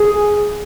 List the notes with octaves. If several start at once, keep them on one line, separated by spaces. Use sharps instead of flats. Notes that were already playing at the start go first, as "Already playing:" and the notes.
Already playing: G#4